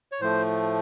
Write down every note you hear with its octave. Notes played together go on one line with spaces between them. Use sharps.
C#5
A2 F3 A3 C5